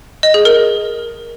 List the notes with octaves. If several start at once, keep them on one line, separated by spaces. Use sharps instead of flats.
D#5
G#4
A#4